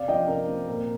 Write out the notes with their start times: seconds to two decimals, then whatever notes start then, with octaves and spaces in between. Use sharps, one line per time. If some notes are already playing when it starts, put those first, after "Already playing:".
Already playing: C3 D5 F5
0.08 F3 D#5 G5
0.28 C3 A#4
0.48 C4
0.68 A#2 A#4